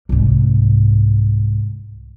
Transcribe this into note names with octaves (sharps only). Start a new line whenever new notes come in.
C2 G#2